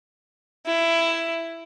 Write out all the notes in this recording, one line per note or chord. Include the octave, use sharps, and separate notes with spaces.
E4